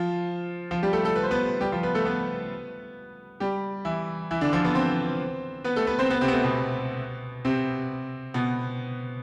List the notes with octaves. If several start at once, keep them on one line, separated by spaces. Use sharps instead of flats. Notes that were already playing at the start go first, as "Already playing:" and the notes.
Already playing: F3 F4
F3 F4
G3 G4
A3 A4
A3 A4
B4
C5
B3 B4
G3 G4
F3 F4
B3 B4
A3 A4
B3 B4
G3 G4
E3 E4
E3 E4
D3 D4
F3 F4
B3 B4
C4 C5
B3 B4
A3 A4
B3 B4
C4 C5
B3 B4
C3 C4
B3
A3
B2 B3
C3 C4
B2 B3